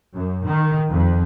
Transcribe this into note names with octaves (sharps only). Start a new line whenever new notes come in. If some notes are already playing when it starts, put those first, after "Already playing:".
F#2
D#3
F2